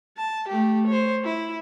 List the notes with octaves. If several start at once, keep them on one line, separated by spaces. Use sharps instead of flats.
A5
A3 G4
C5 C#5
E4